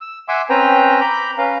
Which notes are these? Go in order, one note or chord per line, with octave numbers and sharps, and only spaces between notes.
E6
E5 F#5 G#5 C6 D6 E6
C4 C#4 B4 C5 G5 A#5
A#5 B5 D6 G6
C#4 B4 F5 A#5